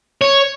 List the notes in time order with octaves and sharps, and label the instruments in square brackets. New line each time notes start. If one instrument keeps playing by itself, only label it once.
[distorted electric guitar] C#5